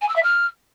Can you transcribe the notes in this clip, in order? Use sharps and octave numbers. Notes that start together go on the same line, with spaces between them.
G#5
E6
E5
F6